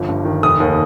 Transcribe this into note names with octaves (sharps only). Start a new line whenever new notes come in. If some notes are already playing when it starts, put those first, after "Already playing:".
Already playing: G1 F3
G2
D#3
F1 D#6
D#2